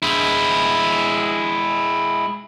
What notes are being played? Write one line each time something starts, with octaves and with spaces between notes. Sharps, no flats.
G#3 E4